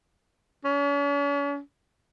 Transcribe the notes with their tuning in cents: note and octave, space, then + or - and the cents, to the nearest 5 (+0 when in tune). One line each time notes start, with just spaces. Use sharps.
C#4 +45